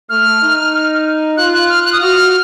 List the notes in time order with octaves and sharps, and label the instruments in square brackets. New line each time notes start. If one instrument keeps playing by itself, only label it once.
[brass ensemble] A3 [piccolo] F6
[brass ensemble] D#4
[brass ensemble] F4 [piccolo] F#6
[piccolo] F#6
F6
F#6
D#6
[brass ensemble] F#4 [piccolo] F6